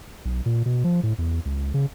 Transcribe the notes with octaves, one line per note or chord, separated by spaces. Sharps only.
B1
A#2
B2
F3
A2
E2
C#2
C#3